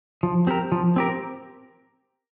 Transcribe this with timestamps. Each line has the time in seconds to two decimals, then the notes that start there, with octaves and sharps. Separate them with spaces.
0.23 F3
0.47 C4 G4 A#4
0.72 F3
0.96 C4 G4 A#4